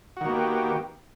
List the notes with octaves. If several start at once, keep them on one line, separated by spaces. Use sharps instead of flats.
D#3 A#3 B3 F#4 G4